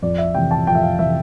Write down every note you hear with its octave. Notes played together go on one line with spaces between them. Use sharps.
F2 D5
E5
C3 E3 G5
A5
F2 G5
E5
F5
C3 E3 E5